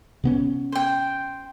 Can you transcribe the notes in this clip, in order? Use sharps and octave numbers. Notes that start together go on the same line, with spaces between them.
C3 B3 C#4
C5 G5